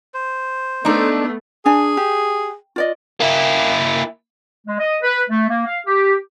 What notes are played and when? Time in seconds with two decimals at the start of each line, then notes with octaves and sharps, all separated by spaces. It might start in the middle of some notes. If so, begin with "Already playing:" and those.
0.14 C5
0.85 A3 B3 D4 D#4
1.66 D4 G#4 G#5
1.97 G4
2.76 F4 D5 D#5
3.20 A#3 E4
4.67 G#3
4.79 D#5
5.03 B4
5.29 A3
5.49 A#3
5.66 F5
5.86 G4